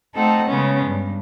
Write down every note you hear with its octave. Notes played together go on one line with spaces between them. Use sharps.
A3 C4 D#4 A4 F#5
C#3 G#3 B3 C#4
G2